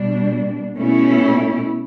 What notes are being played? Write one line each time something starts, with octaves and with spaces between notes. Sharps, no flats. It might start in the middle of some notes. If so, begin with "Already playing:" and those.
Already playing: B2 G3 D4
B2 A3 C#4 E4